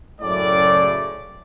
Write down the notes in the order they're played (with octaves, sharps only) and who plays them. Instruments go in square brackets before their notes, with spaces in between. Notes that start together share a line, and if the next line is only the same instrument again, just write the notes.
[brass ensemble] F#2 A2 C#3 D5